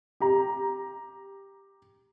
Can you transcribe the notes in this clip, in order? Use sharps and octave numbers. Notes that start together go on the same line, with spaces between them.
G4 A#5